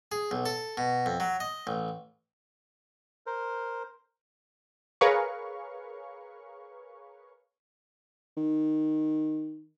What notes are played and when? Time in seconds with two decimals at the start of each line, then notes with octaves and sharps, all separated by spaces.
0.12 G#4
0.31 B1
0.46 A4
0.77 B2
1.06 F2
1.20 F#3
1.40 D#5
1.67 A1
3.26 A#4 C5
5.01 G#4 A#4 B4 C#5 F5 C#6
8.37 D#3